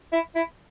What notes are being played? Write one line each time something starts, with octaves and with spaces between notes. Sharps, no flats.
E4
E4